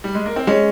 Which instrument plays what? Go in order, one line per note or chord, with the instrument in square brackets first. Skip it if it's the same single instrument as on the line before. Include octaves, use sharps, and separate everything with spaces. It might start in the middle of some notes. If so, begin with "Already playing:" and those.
[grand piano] G3
G#3
A#3
C4
[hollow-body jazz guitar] G#3 [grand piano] C#4